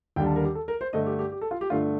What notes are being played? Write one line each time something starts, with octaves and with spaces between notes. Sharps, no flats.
D#2 D3 G3 G5
A5
A#4
G4
A4
A#4
C5
G2 D3 A3 D#5
G4
G4
G4
A4
F4
G4
G2 D3 A3 F4